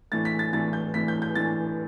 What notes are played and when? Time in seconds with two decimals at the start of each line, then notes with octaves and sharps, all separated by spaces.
0.12 A2 E3 A3 D4 A6
0.25 B6
0.39 A6
0.53 A2 E3 A3 D4 A6
0.73 G6
0.94 A2 E3 A3 D4 B6
1.08 G6
1.22 G6
1.35 A2 E3 A3 D4 A6